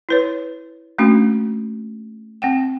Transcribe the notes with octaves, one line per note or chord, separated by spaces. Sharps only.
E4 B4 C#5
A3 A#3 C#4 D4 F#4
C4 F#5 G5